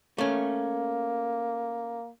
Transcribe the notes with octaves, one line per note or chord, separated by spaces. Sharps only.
A3 A#3 C#4